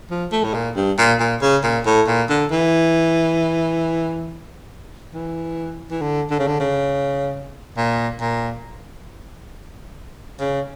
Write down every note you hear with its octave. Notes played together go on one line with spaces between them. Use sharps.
F3
A3
A2
A#2
G2
A#2
A#2
C#3
A#2
A2
A#2
D3
E3
E3
E3
D3
D3
C#3
D3
C#3
A#2
A#2
C#3